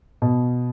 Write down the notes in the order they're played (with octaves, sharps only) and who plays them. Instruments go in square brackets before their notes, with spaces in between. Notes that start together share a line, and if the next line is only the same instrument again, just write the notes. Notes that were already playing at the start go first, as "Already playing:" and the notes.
[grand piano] B2